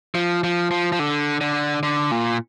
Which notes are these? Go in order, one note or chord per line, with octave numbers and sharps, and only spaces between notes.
F3
F3
F3
F3
D3
D3
D3
A#2